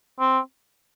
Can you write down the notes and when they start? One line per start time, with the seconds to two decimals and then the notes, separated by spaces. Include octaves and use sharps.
0.20 C4